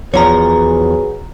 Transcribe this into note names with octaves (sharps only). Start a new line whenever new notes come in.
E2 F3 F#4 G#4 B4 C#5 A#5